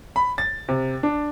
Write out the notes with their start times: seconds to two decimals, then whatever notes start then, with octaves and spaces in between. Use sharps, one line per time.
0.16 B5
0.38 A6
0.68 C3
1.03 D4